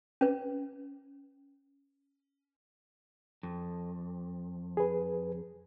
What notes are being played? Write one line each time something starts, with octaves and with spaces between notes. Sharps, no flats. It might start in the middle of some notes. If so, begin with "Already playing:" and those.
C#4 B4
F2
G#4 B4